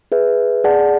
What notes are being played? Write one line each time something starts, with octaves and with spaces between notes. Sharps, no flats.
G#4 B4 E5
G#4 D5 F#5 A5